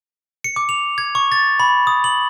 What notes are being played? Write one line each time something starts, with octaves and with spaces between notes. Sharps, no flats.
C#7
D6
F7
G#6
C#6
A6
B5
D#6
F#7